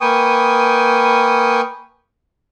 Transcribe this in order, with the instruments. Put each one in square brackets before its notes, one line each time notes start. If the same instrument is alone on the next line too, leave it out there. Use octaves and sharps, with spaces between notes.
[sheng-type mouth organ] A#3 B4 G5 G#5 C#6 D#6